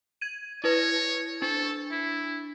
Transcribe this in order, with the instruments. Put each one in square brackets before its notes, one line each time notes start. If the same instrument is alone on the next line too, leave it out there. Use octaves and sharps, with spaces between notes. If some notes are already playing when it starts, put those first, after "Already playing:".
[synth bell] G#6 D#7
[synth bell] E4 B4 [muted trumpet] C#5
[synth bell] D4 [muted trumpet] A4
[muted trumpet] E4